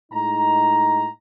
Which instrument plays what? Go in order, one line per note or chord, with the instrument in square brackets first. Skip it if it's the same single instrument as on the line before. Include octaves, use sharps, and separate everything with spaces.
[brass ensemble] A2 G#3 D#4 A#5